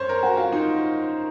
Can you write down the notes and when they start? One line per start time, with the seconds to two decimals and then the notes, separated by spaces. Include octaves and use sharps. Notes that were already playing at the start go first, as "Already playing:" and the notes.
Already playing: F#2 C5 C#5
0.09 A#4
0.23 F#4
0.37 F4
0.52 D#4